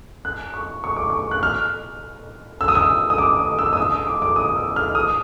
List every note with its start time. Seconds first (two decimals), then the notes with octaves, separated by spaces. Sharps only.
0.25 F#6
0.54 C#6
0.84 C#6
0.96 D6
1.10 C#6
1.31 F#6
1.43 F6
2.61 E6
2.68 D#6
2.75 E6
3.10 D#6
3.18 D6
3.39 D#6
3.59 E6
3.73 D#6
3.77 E6
3.92 D#6
4.07 D6
4.22 D6
4.36 D#6
4.56 E6
4.76 F6
4.95 D#6